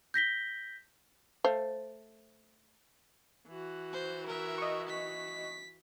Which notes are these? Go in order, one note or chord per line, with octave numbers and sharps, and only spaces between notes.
G6 A#6 B6 G7
A3 C5 F5
E3 F#4
C5
A#4 E5
D#5 C#6
B6